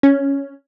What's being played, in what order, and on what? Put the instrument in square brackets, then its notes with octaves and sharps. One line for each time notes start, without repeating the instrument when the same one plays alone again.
[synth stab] C#4